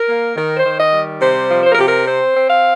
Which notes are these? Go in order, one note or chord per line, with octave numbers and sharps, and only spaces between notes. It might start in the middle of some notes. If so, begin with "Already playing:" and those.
Already playing: A#4
A#3
D#3 A#4
C5
D#3
D#5
G3
C3 C5
F3
C5
A#4
C3 G4
A#4
C4 C5
C4
F5